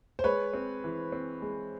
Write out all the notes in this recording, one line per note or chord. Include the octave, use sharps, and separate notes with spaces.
C5
G#3 B4 C#5
C4
E3
C4
G#3